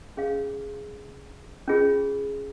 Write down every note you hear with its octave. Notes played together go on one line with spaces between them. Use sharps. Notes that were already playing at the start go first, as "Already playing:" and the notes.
C#4 G#4 F5
C#4 F4 G#4